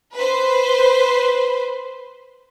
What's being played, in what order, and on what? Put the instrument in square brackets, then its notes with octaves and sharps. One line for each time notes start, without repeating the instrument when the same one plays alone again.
[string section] B4 C5